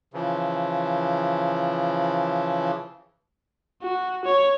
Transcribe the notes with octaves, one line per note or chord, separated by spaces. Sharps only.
C#3 E3 F3
F#4
C#5